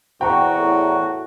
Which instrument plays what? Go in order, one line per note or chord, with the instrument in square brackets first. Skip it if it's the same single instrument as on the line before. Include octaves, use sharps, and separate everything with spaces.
[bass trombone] E2 [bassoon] C4 [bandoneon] F#4 [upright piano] G5 A#5 C#6
[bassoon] A2